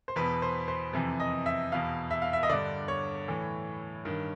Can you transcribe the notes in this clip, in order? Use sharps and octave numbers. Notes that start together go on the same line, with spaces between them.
C5
E2 B2 B4
C5
C5
F2 C3 E3
D#5
E5
E2 B2 F5
E5
F5
E5
D#5
G2 D3 D5
C#5
A2 E3
G2 D#3